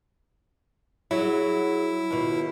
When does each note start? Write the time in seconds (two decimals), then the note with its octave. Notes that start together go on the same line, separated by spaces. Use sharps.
1.11 F#3 E4 G#4
2.10 D#2 B2 F4 F#4